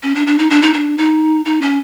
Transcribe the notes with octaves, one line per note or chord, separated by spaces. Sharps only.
C#4
D4
D4
D#4
D4
D#4
D4
D#4
D#4
C#4